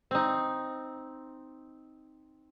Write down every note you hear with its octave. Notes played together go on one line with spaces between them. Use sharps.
C4 D#4